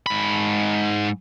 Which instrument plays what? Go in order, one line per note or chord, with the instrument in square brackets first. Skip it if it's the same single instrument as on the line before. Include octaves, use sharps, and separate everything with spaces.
[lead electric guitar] G#2 B5